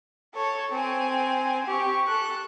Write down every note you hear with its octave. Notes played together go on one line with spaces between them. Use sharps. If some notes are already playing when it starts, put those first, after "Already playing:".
A4 C#5
C4 G#5
G4 C#6
A4 F#6